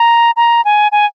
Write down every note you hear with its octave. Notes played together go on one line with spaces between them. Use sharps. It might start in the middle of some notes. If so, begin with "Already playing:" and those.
Already playing: A#5
A#5
G#5
G#5